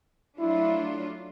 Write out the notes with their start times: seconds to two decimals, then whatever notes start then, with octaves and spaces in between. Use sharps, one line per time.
0.38 F#3 A3 D4 E4 F4